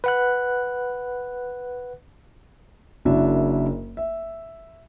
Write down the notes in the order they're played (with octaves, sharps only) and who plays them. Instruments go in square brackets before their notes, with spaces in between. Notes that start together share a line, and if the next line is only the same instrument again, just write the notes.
[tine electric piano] B4 F#5 F#6
[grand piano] F#1 F#2 D4 E4 F#4 E5
E5